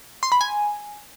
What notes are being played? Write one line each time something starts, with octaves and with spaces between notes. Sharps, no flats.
C6
B5
G#5